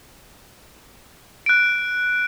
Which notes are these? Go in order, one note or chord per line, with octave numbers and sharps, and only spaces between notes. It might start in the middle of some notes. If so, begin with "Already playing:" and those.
F#6 D7